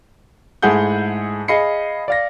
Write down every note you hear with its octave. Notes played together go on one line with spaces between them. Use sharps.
G#2 A3 E4 G#4 F#5 G6
G#4 D#5 F5 B5 C7 C#7
D5 F5 A#6